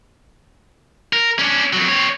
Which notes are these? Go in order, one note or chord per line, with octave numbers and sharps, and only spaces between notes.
A#4
C#4 D4
F2 F#3
C4 C#5